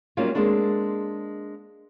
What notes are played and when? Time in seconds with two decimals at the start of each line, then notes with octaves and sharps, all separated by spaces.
0.17 F#3 G3 A#3 C#4 D#4 F4
0.35 G#3 A#3 C4 D4